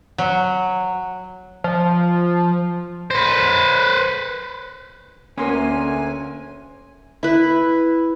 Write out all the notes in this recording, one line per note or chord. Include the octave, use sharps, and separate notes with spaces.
F#3
F3
B4 C5
D2 A#3 B3 C#4 A#4 G#5 C6
E4 B4